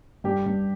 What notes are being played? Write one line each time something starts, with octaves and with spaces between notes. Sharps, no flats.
G2 G4
G2